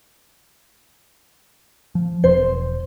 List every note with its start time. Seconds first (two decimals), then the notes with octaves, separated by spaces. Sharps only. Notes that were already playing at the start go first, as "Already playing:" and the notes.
1.95 F3
2.24 E1 C5